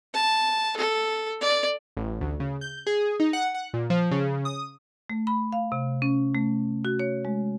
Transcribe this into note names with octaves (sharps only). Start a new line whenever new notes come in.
A5
A4
D5
A1
D2
C#3
G6
G#4
D#4
F#5
F#5
A#2
F3
C#3
D#6
A3
B5
F5
C3
C#4
A3
F#4
C#5
G#3